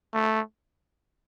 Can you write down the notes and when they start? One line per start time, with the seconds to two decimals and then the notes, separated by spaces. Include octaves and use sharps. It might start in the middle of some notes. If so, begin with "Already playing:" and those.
0.14 A3